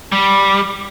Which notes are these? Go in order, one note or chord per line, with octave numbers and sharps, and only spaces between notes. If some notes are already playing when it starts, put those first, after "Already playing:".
G3